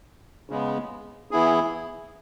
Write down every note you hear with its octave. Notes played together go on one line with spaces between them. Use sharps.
C#3 G#3 B3
E3 B3 E4 G#4